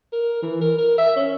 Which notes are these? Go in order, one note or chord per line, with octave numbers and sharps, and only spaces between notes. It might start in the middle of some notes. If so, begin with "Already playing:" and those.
A#4
E3
A#4
A#4
E5
C#4